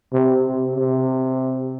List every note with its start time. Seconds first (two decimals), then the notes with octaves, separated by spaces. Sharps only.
0.13 C3
0.44 C3
0.75 C3